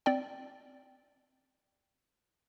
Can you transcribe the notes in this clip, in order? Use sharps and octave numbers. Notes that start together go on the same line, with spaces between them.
C4 D5 G5